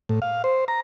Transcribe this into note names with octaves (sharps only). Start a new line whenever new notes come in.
A2
F5
C5
A#5